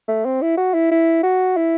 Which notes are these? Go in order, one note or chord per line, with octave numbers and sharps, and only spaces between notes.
A3
C4
E4
F#4
E4
E4
F#4
E4